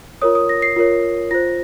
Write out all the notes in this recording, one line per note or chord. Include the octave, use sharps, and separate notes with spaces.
F4 A#4 C#5 D#6
D#6
A#6
C7
F4 A#4 C#5
F4 C5 A#6